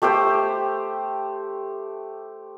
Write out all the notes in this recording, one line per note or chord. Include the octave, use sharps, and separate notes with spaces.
A3 G4 C5 G5